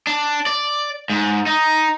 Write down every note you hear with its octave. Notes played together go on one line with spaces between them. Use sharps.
D4
D5
G#2
D#4